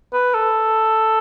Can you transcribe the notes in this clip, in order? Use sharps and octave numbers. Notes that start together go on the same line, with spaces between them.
B4
A4